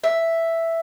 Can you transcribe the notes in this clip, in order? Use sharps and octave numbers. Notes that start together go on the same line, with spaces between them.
E5